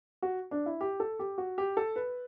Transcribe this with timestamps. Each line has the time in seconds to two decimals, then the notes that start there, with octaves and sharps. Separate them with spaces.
0.22 F#4
0.51 D4
0.66 E4
0.81 G4
1.00 A4
1.19 G4
1.38 F#4
1.58 G4
1.77 A4
1.96 B4